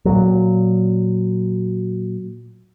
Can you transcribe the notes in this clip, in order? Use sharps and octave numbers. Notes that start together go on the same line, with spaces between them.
A#2 F#3